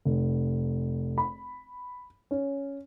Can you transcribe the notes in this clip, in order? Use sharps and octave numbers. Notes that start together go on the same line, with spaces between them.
F1
B5
C#4